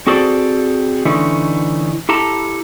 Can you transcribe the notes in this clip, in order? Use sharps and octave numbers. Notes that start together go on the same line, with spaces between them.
C4 F#4 G#4 A4 C5 D5
D3 E3 A3 C#4 D#4
E4 G4 A4 A5 A#5